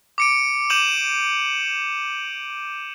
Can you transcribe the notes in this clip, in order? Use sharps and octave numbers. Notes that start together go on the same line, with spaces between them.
D6 C#7 D7
D6 G6 D#7 E7 F#7